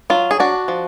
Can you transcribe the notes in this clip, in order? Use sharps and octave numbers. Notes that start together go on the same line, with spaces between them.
F#3 F4
G#4
D4 F#4
F3